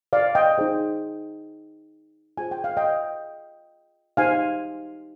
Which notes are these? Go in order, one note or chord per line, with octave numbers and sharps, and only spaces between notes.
D5 F5
D#5 G5
D#4 G#4 C5
F4 G#4 C5 G#5
G5
F5
D#5 G5
D#4 G4 C5 F5 G#5